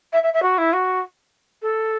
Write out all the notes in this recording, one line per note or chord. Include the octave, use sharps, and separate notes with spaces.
E5
E5
E5
F#4
E4
F#4
A4